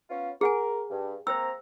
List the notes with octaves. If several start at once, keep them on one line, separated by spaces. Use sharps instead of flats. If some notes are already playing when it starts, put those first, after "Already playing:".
B3 C#4 F4
G#4 A#4 F#5 G#5
G2
A#3 C4 C5 G5 A#5 E6